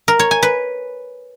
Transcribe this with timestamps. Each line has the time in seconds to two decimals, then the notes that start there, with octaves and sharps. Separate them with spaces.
0.08 A#4
0.19 C#5
0.31 G#5
0.43 B4